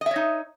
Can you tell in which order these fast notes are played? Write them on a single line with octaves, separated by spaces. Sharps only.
D#5 E5 C#5 D#4